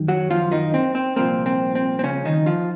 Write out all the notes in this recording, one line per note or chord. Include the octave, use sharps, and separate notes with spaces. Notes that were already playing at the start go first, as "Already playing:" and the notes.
Already playing: F#2 D#3
F#3 F#4
F3 F4
D#3 D#4
C4
C4
C2 A#2 F3 A#3 C4
C4
C4
C4
C#3 C#4
D#3 D#4
F3 F4